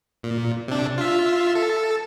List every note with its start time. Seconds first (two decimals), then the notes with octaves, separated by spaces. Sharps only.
0.23 A#2
0.68 C3 D4
0.98 F4 E5
1.55 A4